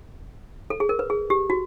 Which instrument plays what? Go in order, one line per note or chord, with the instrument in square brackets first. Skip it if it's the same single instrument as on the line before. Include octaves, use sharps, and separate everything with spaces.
[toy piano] A4
G#4
A#4
B4
G#4
G4
F#4